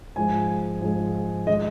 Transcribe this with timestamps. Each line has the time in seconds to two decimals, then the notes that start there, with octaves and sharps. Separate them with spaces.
0.16 G#2 F3 G#3 G#5
0.81 G#2 F3 G#3
1.47 D#3 G#3 D#5